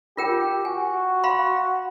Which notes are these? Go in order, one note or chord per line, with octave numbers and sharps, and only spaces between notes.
F4 G4 A#4 G5
F#4 G#5
F5 B5 C6